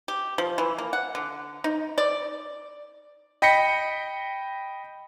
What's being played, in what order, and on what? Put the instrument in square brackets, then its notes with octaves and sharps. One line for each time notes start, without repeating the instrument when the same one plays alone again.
[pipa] G4
F3
E3
A#3
F#5
D3
D#4
D5
[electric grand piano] D#5 G5 B5 A#6 B6 C#7